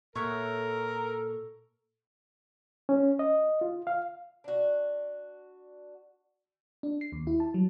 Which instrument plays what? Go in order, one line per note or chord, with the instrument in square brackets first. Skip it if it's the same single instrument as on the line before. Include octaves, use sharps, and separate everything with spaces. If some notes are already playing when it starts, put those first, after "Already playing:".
[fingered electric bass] A#2 [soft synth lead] A4 [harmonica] A#4 [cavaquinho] C#5 E5 F#5
[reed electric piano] C#4
D#5
F4
F5
[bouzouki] D4 F#4
[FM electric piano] D4
C7
D#2
E4
A5
F#3